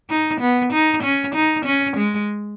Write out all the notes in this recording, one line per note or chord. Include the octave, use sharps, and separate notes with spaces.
D#4
B3
D#4
C#4
D#4
C#4
G#3